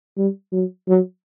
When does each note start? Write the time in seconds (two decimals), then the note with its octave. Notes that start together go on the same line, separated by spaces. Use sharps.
0.18 G3
0.53 F#3
0.88 F#3